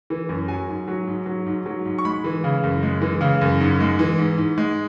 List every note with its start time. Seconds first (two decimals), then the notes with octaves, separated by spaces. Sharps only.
0.10 E3
0.29 F#2
0.48 F#3 G#5
0.69 G#2
0.88 F#3
1.07 G#2
1.26 F#3
1.46 G#2
1.66 F#3
1.85 G#2
1.98 C#6
2.05 G#3 B5
2.24 E3
2.44 C#3
2.63 F#2
2.83 G#3
3.01 E3
3.21 C#3
3.41 F#2
3.60 G#2
3.80 G#3
3.99 E3
4.18 G#2
4.38 G#2
4.58 G#3